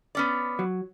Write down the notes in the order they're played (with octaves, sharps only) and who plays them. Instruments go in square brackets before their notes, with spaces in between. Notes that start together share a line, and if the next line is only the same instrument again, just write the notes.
[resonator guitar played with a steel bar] B3 C#4 D5
[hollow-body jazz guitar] F#3